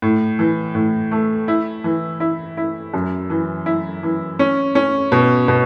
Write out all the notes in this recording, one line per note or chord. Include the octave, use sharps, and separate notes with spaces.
A2
E3
A2
A3
E4
E3
E4
E4
F#2
E3
E4
E3
C#4
C#4
B2
B2